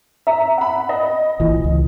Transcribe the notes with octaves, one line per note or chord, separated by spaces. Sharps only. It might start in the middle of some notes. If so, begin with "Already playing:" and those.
E5 A#5
F#5 B5
D#5
A#1 E3
C#2